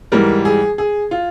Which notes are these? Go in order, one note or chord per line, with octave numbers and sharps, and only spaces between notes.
G#2 E3 G3 A#4
G#4
G#4
F4